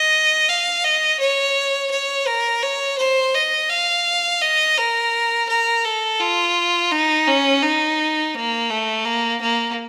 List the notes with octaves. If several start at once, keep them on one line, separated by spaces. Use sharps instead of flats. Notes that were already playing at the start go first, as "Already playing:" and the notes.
Already playing: D#5
F5
D#5
C#5
C#5
A#4
C#5
C5
D#5
F5
D#5
A#4
A#4
A4
F4
D#4
C#4
D#4
A#3
A3
A#3
A#3